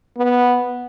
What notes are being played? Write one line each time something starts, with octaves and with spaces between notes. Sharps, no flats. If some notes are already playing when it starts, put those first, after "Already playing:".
B3